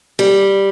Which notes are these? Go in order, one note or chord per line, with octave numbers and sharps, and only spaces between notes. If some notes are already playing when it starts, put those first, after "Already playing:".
G3